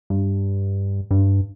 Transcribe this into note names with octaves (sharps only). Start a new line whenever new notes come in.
G2
G2